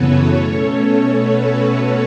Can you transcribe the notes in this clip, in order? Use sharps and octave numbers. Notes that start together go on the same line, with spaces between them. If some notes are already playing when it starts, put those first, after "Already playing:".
Already playing: F#2 C#3 E3 B3 F#4 A4 B4 C#5
B2 A3 C#4
F#4 B4